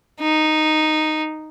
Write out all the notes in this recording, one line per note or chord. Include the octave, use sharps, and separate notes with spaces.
D#4